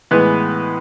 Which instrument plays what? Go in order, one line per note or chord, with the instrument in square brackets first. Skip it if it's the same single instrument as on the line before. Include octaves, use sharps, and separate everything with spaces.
[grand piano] A2 E3 G#3 B3 B4